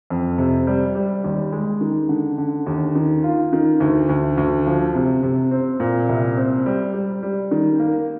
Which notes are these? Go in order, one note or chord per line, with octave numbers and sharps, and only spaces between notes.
F2
C3
G3
G3
D#2
G#3
D#3
D3
D3
D#2
D#3
F4
D#3
D2
D2
D2
F3
C3
C3
C4
A#2
C2
C4
G3
G3
G3
D#3
A#3